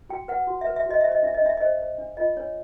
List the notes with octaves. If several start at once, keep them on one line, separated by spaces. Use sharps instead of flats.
F#4 G5
B4 F#5
F#4
E5
B4
E5
F#4 D#5
C5 E5
D#5
D4 E5
D#5
D4 E5
C5 D#5
C5
D4
F4 D#5
D4 C#5